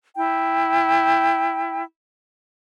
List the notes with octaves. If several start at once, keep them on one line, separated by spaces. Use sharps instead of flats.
E4 G5